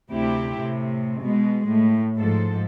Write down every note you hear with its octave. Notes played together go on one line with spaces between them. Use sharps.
D2 C3 E4 G4
A2 C3
B2 G#3
A2
G#2 F3 A4